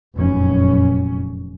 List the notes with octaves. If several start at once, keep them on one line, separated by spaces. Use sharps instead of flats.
F1 F#2 A#2 C#4